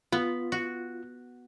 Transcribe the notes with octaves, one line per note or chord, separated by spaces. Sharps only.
B3 F4
F#4